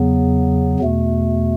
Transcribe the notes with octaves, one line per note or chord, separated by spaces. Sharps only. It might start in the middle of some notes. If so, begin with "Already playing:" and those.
Already playing: E2 C#3 F#3 B3
E2 B2 A3